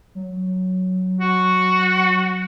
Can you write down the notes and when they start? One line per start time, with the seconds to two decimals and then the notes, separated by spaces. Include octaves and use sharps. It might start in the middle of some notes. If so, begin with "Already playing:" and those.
0.15 F#3
1.21 F#4